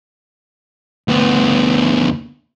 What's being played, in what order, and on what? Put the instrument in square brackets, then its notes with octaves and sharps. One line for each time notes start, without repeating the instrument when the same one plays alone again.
[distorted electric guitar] D2 B3